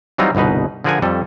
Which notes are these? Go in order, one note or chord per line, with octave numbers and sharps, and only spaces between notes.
E3 F#3 G3 C4 D#4 F4
G1 C2 B2 D#4 B4
D3 F3 G#4 A#4 F#5 G#5
F2 G3 A4